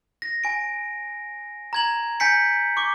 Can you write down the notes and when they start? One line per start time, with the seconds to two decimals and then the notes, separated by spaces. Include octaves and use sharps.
0.22 A#6
0.44 G#5 D7
1.73 A#5 G#6 F#7
2.20 G#5 G6 B6 C#7
2.77 C#6 D6